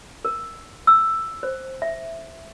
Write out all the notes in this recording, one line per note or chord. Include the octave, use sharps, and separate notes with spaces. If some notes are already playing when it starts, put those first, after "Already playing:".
A#4
E6
C5
E5